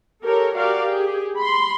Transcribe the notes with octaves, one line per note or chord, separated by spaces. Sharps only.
G4 A4 A#4 C#5
F#4 G4 A#4 D5 F5
G4 G#4
B5 C6